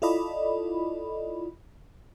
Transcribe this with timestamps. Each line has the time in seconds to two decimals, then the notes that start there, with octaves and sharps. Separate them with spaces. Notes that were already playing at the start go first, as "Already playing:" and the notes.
0.02 E4 F4 A4 D5 D#5 B5